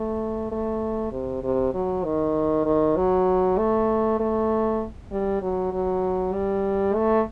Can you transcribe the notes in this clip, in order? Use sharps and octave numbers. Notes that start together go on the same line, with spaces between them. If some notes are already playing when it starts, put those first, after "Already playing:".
Already playing: A3
A3
C3
C3
F#3
D#3
D#3
F#3
A3
A3
G3
F#3
F#3
G3
A3